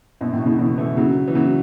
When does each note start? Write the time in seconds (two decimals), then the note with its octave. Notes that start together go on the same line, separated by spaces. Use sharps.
0.21 F#2 B2
0.33 A2
0.46 A2 C#3
0.58 B2 E3
0.78 E3 A3
0.97 C#3 F#3
1.28 E3
1.35 C#3 F#3